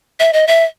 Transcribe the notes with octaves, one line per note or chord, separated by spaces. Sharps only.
E5
D#5
E5